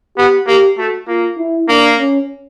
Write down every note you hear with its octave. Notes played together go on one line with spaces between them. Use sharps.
B3 G4
A#3 G4
A3 F#4
A#3 F4
E4
A#3 D4
C#4